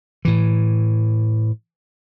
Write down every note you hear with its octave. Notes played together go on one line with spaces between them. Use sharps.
A2 E3